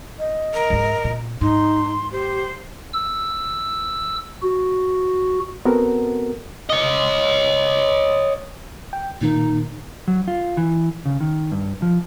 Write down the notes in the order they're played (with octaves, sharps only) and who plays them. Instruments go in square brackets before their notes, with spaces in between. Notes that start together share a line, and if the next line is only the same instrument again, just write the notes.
[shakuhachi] D#5
[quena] A#4
[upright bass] G#2 G#3
A#2
[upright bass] G#2 [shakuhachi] D#4 [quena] C6
[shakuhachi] G4 [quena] C5
[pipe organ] E6
F#4
[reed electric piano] B3 C4 F#4 A4 A#4
[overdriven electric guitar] C#5 D#5
[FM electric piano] G5
[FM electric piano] A#2 D#3 A#3 [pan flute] D#4
[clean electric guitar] F#3
F4
E3
C#3
D#3
G2
F3